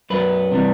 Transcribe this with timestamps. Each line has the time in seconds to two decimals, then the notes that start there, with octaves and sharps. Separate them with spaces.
0.10 F#2 F#3 B4
0.52 C3 E3 G3